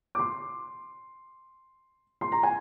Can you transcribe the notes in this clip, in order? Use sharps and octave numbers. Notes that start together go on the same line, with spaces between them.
D6
C6
C6
A#5
G#5